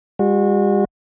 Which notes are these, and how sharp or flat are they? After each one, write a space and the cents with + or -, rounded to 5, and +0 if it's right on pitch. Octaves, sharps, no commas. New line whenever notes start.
G3 +45 F#4 -30